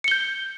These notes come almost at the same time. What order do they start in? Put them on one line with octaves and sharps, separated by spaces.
C#7 G7 G6